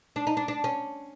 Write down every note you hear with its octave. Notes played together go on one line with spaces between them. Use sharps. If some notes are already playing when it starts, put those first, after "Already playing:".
D4
D#4
D4
D4
C#4